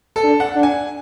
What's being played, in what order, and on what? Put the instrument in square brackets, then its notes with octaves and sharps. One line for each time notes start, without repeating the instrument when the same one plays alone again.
[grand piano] A4
[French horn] D4
[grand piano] F#5
[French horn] D4
[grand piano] G#5